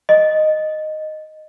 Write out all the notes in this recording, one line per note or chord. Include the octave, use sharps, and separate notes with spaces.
D#5